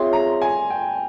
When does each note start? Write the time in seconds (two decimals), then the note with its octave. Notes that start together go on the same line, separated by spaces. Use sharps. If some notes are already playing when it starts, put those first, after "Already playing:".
Already playing: C4 F4 G#4 C#5 E5 C6
0.13 A#5
0.42 G#5
0.70 G5